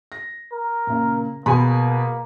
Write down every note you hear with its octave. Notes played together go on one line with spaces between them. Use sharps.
A#6
A#4
A#2 C#3
B2 A#3 G#4 G#5 B5